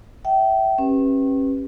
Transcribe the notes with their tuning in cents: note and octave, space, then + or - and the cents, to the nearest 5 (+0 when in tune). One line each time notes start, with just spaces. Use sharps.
E5 +0 G5 -30
C#4 -35 G4 +0 B4 +0